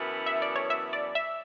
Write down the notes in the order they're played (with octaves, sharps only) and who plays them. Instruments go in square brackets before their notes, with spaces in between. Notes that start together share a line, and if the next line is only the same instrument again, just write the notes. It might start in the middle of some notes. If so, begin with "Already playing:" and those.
Already playing: [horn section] F#2 E3 B3 E4 A4
[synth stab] E5
D5
C#5
E5
D5
E5